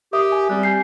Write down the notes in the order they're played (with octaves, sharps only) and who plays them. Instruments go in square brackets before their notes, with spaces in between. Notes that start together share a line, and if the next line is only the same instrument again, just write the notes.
[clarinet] G4 [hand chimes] A#4 E5 D#6
[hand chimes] G#5
[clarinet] G3 [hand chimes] C4 G4 F#6
[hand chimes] G#5 G6 C7